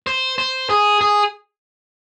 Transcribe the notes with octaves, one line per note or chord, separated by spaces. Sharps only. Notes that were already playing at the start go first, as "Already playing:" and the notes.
C5
C5
G#4
G#4